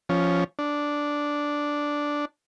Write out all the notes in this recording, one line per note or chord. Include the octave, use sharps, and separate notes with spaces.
F3 C#4
D4